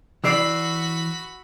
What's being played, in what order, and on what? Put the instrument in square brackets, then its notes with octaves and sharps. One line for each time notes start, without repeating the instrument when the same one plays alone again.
[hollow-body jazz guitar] E3 D5 [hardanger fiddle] F#4 B5 [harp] E6 C7